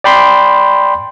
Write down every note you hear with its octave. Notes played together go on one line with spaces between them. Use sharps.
D5 G5 B5 C6